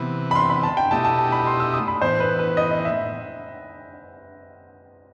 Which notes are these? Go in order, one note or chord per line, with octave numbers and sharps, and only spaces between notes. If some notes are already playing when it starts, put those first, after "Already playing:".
Already playing: C3 E3 B3
B5
C6
B5
A5
G5
B2 A3 E4 G4 D#5 A5
A5
A5
B5
C6
E6
D#6
B5
A2 E3 B3 C5
B4
B4
D#5
D#5
E5